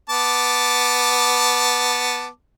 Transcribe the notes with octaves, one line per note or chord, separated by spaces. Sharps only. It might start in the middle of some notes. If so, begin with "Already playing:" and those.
B3 A5 D6